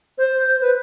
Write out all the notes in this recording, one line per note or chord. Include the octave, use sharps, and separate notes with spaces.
C5
B4